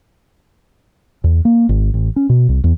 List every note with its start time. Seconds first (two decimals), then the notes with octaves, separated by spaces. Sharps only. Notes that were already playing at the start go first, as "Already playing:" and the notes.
1.24 E2
1.45 A#3
1.69 G#1
1.94 A1
2.16 C#4
2.29 B2
2.49 C2
2.64 E2